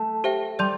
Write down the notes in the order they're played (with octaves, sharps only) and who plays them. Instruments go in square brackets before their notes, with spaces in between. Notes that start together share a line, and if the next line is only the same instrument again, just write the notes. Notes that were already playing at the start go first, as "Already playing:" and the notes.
Already playing: [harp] A3
[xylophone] G4 C5 E5 G5
[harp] G3 [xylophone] D5 A5 C6 G6